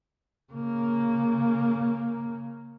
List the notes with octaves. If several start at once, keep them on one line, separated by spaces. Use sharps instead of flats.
C#3 A#3